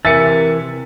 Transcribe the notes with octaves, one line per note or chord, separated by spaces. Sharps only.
C3 E3 A#4 E5 G#5 A6 C#7